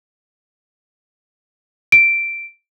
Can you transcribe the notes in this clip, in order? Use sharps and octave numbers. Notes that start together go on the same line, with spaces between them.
D7